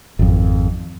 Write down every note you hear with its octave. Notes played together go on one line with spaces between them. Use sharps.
G#1 F2